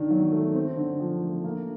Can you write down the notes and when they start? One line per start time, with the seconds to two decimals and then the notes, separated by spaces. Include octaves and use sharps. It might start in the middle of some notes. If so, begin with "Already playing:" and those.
Already playing: D#3 D4
0.10 F#3
0.32 A3
0.54 C4
0.77 D3
1.00 F3
1.22 A3
1.44 A#3